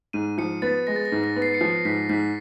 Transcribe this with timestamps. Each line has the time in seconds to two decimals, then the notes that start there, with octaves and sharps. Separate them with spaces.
0.13 G#2 D#7
0.38 F3 C#7
0.62 B3 A6
0.87 G#3 A#6
0.96 A6
1.05 A#6
1.12 G#2
1.24 A#6
1.36 B3
1.42 C7
1.54 C#7
1.60 F3 C7
1.85 G#2 B6
2.09 G#2 B6